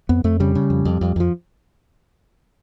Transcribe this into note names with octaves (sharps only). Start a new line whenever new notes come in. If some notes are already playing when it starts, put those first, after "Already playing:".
F2 B3
F2 A3
C#3 G3
C#3
F2
F2
F2
F2 F3